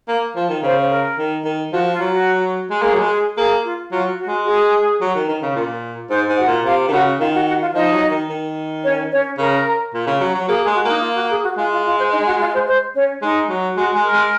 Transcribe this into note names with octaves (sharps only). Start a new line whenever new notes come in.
A#3
F3
D#3
C#3 C5
C5
A#4
D#3
D#3
F3 F#4
F4
F#3
F#4
G#3
A#3 G#4
F#3
G#3
G#4
A#3 G#4
F4
F#3 F4
F#4
G#3
F#4
G#4
F#3
D#3
D#3
C#3
A#2
G#2 C5
G#2
F#4 F#5
A#2
C3 F4 F5
D#3
C#3 F#4 F#5
D#3 F4 F5
F#4 F#5
F#4 F#5
F4 F5
F3 D#4 D#5
F#3
D#3
D#3
C#4 C#5
C#4 C#5
C#3 A#4
A#2
C#3
F#3
F#3
A#3 G#4
G#4
G#3
F#4
A#3 D#4
F4
F#4
G#4
F#4
G#3 F4
F4
F4
C5
D#4 D#5
F#4 F#5
F4 F5
C5
C5
C#4 C#5
G#3 D#4
F#3
G#3 F#4
G#3
A#4
G#3